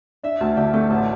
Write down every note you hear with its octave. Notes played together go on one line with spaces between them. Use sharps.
D4 E5
D2 A5
D3 G4
A3 G4
A1 A4